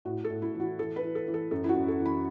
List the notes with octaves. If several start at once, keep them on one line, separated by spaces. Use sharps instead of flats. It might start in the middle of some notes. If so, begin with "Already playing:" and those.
A2 F#4
A4
A2
E4
E3
F#4
E3 A4
B4
E3
A4
E3
A4
F#2 A4
E4
F#4
F#2
A4
E3
B5